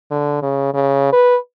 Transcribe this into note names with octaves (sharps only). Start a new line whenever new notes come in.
D3
C#3
C#3
B4